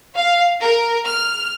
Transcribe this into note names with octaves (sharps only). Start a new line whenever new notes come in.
F5
A#4
F6